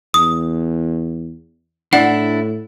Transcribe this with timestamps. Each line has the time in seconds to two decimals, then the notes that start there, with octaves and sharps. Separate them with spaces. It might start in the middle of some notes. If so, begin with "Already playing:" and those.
0.14 E2 D#6
1.93 A2 D4 E4 F#5